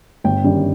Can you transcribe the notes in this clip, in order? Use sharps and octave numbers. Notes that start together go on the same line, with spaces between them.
G1 G5
F#2 D#3 G3